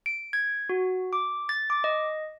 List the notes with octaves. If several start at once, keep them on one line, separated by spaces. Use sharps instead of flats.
D7
G#6
F#4
D6
A6
D6
D#5